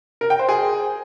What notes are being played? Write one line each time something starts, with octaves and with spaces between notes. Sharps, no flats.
A#4
G5
C5
G#4